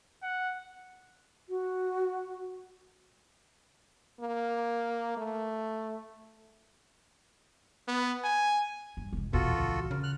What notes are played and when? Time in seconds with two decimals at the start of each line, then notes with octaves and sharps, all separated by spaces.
0.23 F#5
1.49 F#4
4.21 A#3
5.17 A3
7.88 B3
8.24 G#5
8.97 G2
9.13 F1 G#2
9.33 A#1 E2 B2 F4 F#4 A4
9.57 C#2
9.91 C#3 A#4
10.03 F6 F#6